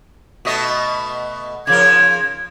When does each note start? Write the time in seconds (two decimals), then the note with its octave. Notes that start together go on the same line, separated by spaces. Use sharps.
0.45 B2 A3 D#5
1.67 C#3 F3 A#4 G#6